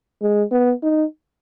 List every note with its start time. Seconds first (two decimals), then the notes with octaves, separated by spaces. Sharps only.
0.22 G#3
0.52 B3
0.83 D#4